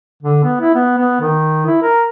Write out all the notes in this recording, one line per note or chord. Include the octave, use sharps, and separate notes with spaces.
D3
B3
E4
B3
B3
D#3
E4
A#4